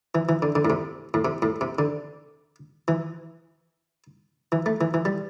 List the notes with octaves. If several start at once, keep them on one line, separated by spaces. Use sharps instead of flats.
E3
E3
D3
D3
A2
C3
A2
C3
A2
C3
D3
E3
E3
A3
E3
E3
G3